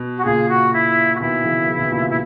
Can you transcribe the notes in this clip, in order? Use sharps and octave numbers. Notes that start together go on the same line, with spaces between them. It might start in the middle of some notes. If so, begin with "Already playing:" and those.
Already playing: B2
F#4
A#2 C#3 G#4
F#4
E4
F#4
B2 D#3 E4
C#3 E3
C#3 E3
B2 D#3
A#2 C#3
B2
E4